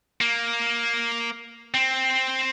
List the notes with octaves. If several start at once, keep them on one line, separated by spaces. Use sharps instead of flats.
A#3
C4